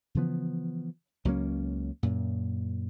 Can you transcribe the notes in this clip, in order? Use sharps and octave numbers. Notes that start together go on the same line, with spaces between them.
C#3 E3 F3 B3
C#2 F#3 A#3 C#4
F#2 A#2